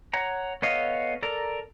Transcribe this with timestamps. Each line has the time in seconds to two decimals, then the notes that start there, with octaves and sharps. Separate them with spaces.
0.13 C#5 F#5 A#5
0.62 B3 A4 C#5 D#5 F5
1.23 A4 A#4 D5 A#5